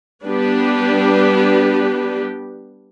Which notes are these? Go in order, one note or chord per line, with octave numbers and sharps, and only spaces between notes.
G3 B3 D4 G4 B4